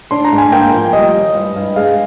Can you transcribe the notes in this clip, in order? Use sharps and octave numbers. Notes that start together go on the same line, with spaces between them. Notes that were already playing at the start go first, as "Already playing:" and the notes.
D4 C6
A#5
G#2
G#5
A#3 G5
F3 G5
G3 D#5
D#2
G2
G2
G#3 F5